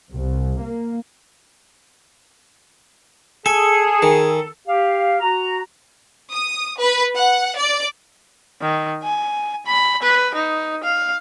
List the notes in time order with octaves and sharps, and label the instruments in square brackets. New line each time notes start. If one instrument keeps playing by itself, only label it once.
[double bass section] C2
A#3
[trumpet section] G#4 [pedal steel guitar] A4 [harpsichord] G#5
[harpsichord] D#3
[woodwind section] G4 F5
F#4 A#5
[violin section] D#6
B4
F#5
D5
[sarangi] D#3
G#5
B5
B4
D#4
F5